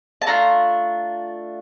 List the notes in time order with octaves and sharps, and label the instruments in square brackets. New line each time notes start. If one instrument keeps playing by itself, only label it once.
[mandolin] A5
A3 D4 F4 A#5